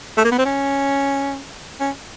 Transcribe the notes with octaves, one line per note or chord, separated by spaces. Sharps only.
A3
A#3
B3
C4
C#4
C#4